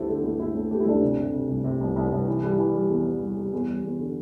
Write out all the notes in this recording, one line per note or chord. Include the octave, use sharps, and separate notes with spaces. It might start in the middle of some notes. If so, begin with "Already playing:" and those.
Already playing: D2 A3 E4 G4 A4 C5
D3
D2 E4
D2 E4
D2
A3 G4
E4
D2 D4 G4
C3
C3
C3
C2
C3
C2
C2
C2
E3
G3
E3
G3
E2
E3
G3
G3
E2
G3
E2
D3